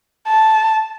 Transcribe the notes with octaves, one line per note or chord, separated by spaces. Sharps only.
A5